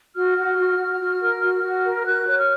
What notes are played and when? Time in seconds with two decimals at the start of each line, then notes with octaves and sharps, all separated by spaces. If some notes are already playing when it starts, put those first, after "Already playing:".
0.16 F#4 F6
0.38 F#4
0.58 F#4
0.79 F#4
1.01 F#4
1.21 A#4
1.42 F#4
1.63 F#4
1.85 A#4
2.06 F#4 F#6
2.28 C#5
2.37 F6